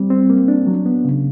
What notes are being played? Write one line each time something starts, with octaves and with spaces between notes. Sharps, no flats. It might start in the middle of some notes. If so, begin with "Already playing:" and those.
Already playing: G3 C4
C4
A#3
D4
F#3
B3
C#3